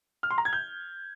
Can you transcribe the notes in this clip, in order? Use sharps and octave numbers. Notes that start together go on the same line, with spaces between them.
F6
C6
A#5
G#6
G6